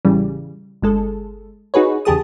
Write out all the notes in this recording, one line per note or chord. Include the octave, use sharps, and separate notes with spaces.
A1 C#3 E3 G3
G1 G#3 A4
D#4 F#4 G#4 B4 C#5
E2 C#3 G4 G#4 A5 D#6